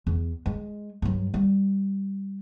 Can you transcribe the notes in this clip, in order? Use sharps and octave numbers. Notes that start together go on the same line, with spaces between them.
E2
G#3
G2 F#3
G3